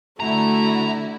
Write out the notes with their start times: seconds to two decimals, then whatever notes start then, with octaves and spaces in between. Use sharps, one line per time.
0.20 D3 A3 E4 F#4 A#5